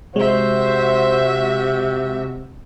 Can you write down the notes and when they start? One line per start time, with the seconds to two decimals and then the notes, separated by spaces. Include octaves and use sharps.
0.16 C3 G#3 F#4 C5 E5